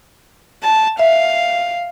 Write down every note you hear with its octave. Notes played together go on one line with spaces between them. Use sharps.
A5
E5 F5